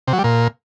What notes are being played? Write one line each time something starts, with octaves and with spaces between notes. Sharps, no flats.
C3
F#3
G3
A#2